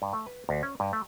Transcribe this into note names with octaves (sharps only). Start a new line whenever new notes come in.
G2
A3
B4
D2
C#4
G2
A3